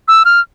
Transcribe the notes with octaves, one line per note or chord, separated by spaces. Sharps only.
E6
F6